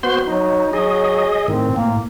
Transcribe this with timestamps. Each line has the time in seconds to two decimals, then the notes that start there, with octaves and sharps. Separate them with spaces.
0.03 B3 F#4 C5 C6
0.27 F#3 D#4
0.73 F#3 G#4 D#5
1.48 A2 D#3 C4
1.76 A2 A#3